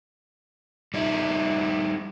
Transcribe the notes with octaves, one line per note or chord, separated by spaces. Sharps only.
G3 D#4 E4